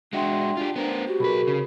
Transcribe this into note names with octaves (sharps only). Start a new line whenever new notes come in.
G#3 D4 F#4 E5 G5 C6
F4 G4
B3 A#4 C5
F#4 G4
B1 G#4 A#4 B4 B5
C#3